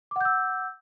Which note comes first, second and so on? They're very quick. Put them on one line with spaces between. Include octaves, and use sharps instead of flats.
D6 F#5 G6 E6